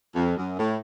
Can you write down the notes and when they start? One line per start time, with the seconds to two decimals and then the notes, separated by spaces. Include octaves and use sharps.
0.15 F2
0.37 F#2
0.59 A2